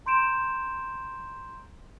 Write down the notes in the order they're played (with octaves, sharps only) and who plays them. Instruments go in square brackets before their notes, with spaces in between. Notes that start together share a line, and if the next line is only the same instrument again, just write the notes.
[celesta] A#5 C6 G6 D7 E7